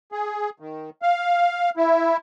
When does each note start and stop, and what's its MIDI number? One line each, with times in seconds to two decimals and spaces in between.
0.12 0.50 68
0.60 0.90 51
1.02 1.70 77
1.77 2.17 64